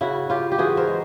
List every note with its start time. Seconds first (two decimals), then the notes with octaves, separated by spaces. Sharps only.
0.01 C#3 E4 F#4
0.30 C#3 F4 G4
0.52 G4
0.58 E3 F#4 G#4
0.77 A#4 C5
0.87 G#3